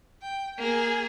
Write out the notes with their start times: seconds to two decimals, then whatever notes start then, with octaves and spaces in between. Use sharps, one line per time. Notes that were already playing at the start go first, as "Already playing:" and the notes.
0.22 G5
0.58 A#3 G#4